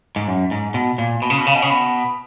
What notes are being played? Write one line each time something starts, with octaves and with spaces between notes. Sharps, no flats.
G#2
F#2
G#2
B2
A#2
B2
C#3
B2
C#3
B2
C#3
B2